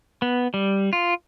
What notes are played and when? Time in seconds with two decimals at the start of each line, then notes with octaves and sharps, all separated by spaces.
0.22 B3
0.54 G3
0.93 F4